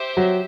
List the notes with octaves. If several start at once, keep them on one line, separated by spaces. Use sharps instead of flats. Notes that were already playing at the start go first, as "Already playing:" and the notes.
Already playing: G4 C5 E5
F#3